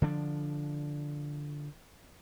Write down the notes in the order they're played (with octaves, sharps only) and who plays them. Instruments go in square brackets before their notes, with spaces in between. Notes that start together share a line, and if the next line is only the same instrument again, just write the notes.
[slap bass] D3 F3 D4